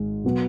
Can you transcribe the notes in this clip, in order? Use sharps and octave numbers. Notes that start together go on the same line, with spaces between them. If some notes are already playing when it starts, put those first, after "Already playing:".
Already playing: G#1 G#2 G#3
B2 F#3 B3